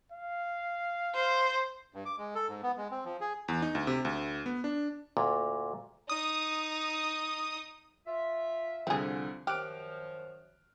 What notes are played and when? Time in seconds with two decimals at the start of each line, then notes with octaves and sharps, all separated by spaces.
0.12 F5
1.15 C5
1.94 G2
2.06 D6
2.18 G#3
2.35 A4
2.49 G#2
2.63 B3
2.77 G#3
2.91 C4
3.05 F3
3.21 G#4
3.48 E2
3.62 D#4
3.75 D2
3.87 C3
4.05 D2
4.46 B3
4.64 D4
5.17 D2 A#2
6.09 D#4 D#6
8.07 F4 E5
8.87 C2 D3 F3 C4 G#4
9.47 F#2 D#3 F3 G4 F6 F#6 D7